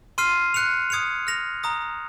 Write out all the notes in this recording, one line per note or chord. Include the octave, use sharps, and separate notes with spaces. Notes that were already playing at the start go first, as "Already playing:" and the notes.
C6 F6 C7 D#7
F#6 C#7 F7
D#6 G#6 C#7 F7
F6 A#6 F7
A#5 D#6 A#6